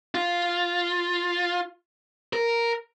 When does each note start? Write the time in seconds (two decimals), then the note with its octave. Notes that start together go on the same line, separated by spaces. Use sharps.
0.15 F4
2.33 A#4